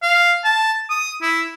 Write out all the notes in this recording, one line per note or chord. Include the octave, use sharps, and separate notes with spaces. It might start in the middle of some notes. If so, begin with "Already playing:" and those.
F5
A5
D#6
E4